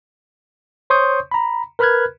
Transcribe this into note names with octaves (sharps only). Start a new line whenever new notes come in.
C5 C#5 C6 C#6 D#6 G6
A#5 B5
A#4 B4 B5 F6 F#6 G#6